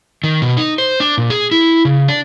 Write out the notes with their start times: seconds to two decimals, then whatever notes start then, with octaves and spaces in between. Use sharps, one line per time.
0.24 D#3
0.42 B2
0.57 D#4
0.78 C5
1.00 D4
1.18 A#2
1.30 G#4
1.51 E4
1.85 C#3
2.08 D4